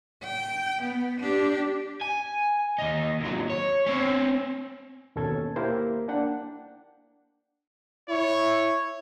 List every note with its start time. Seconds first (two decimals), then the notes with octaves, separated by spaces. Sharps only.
0.23 G5
0.82 B3
1.20 D4 G4
2.01 G#5
2.78 D#2 D#4
3.20 D#2 F#3
3.50 C#5
3.86 C4 C#4
5.16 D#2 B2 C#4 A4 G#6
5.56 A#3 E4 G4 A#4 C5
6.08 A#3 D4 F#5 G5
8.09 E4 C#5